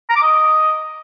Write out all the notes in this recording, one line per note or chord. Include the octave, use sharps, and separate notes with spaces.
A#5
D6
D#5